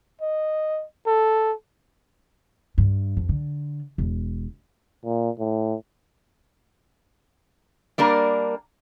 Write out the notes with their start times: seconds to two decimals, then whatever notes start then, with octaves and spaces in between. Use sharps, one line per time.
0.21 D#5
1.06 A4
2.78 G2
3.17 F2
3.29 D3
3.98 E1
5.05 A#2
5.39 A2
7.98 G3 A#3 D4 A#4